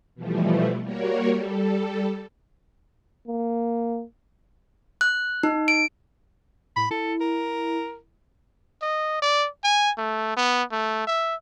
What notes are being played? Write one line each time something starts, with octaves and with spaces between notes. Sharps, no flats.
B2 E3 F3 G3 A3
G3 A#3 F#4 A#4 C#5
G3 A4
A#3
F#6
D#4
D7
A2 B5
E4 A4
A#4
D#5
D5
G#5
A3
B3
A3
E5